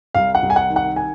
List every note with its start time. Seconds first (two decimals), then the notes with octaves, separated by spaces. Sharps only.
0.14 C2 F5
0.35 F#5
0.42 C2
0.50 G#5
0.56 F#5
0.69 D#3
0.76 F#5
0.96 G#5